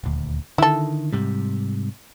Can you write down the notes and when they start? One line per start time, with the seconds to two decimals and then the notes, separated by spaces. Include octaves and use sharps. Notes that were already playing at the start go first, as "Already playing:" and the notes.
0.04 D#1 D2
0.58 D3 D#3 E4 A4
1.12 G#2 C3 G3